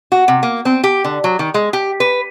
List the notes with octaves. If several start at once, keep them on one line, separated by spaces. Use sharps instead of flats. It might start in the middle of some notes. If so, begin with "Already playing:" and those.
F#4
C3
A#3
C4
G4
D3
F#3
D#3
G#3
G4
B4